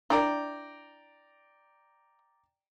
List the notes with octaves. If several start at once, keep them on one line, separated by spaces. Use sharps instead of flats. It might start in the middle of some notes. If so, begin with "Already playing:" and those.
D4 E4 A#4 D5 G5 A#5